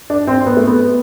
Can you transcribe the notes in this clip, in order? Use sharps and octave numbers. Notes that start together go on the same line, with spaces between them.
D4
C4
B3
A3
B3